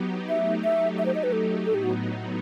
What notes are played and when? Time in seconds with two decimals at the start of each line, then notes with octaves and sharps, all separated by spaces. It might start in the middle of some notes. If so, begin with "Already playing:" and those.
Already playing: F#3 B3 D#4 G4
0.29 F#3 A3 D#4 G4 E5
0.64 E5
0.98 E5
1.06 C5
1.15 D#5
1.23 B4
1.32 A4
1.66 A2 F#3 B3 D#4 A4
1.74 G4
1.84 F#4